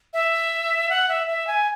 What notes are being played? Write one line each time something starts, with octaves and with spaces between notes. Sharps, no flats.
E5
F#5
E5
E5
G#5